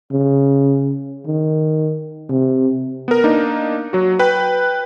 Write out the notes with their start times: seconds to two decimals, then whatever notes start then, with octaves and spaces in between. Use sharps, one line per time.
0.12 C#3
1.26 D#3
2.29 C3
3.08 B3 A#4
3.24 A#3 D4 D#4
3.93 F#3 F#4
4.19 B4 G5 F#6